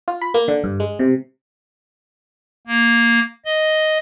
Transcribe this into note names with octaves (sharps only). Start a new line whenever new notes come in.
F4
B5
A#3
D3
G2
G#3
C3
A#3
D#5